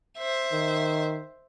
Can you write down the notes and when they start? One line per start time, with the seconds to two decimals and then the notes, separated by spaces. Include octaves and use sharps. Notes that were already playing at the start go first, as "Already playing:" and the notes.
0.18 C5 E5
0.52 D#3